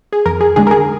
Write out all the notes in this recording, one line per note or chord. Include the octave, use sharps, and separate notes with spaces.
G#4
F2 A#4
G#4
D3 G#3 D4 G#4
A#4
G#4